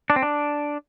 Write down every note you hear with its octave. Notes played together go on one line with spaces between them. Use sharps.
D4
C4
D4